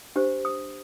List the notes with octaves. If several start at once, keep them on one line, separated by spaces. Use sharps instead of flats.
D4 G4 C5
D#6